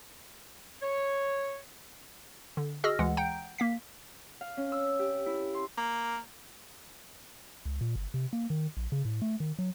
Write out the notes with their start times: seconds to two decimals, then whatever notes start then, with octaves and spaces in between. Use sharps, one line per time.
0.82 C#5
2.57 D3
2.84 F#4 G#4 D#5 E6 F6 A#6
2.99 D2 E3 G#3 F#5
3.17 F#5 G5 A#5 G6 D7
3.58 A#3 F5 B6
4.41 F5
4.57 C#4
4.72 E6
4.99 G4
5.26 E4
5.54 C6
5.77 A#3
7.65 C#2
7.81 A#2
7.95 G1
8.14 C3
8.33 A#3
8.50 D#3
8.77 A#1
8.92 C#3
9.05 A2
9.22 A3
9.40 D#3
9.59 F#3